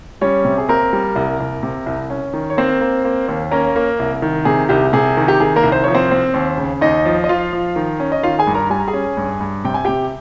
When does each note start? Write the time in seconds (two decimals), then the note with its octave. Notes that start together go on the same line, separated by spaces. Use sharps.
0.21 G3 C#4 C#5
0.45 C3
0.58 G#4
0.69 A#3 C4 A#4
0.93 G3
1.16 C2
1.40 C2
1.63 C3
1.86 C2
2.10 C#4
2.33 D#3
2.50 C#5
2.57 A#3 C4 C5
2.81 A#3
3.05 A#3
3.29 D#2
3.51 A#3 C#4 A#4
3.76 A#3
3.99 C2
4.22 D#3
4.45 C3 G#4
4.69 C2 G4
4.93 C3 G#4
5.17 D#3
5.28 G4
5.40 D#3 G#4
5.56 A#3 A#4
5.63 C2
5.72 C5
5.84 F3 C#5
5.95 C4 C5
6.11 C4
6.34 D#2
6.58 C#3
6.81 D#2 D#4 D#5
7.05 F3
7.24 D#5
7.29 F3 F4 F5
7.53 F3
7.76 D#3
8.00 C#4
8.12 D#5
8.23 D#3 F4 F5
8.39 G#4 G#5
8.47 G2
8.55 A#4 A#5
8.70 G3 G#5
8.80 A#5
8.88 G#4 G#5
8.93 C#4
9.17 G2
9.41 G2
9.64 C3 G5
9.74 G#5
9.85 C3 G4 G5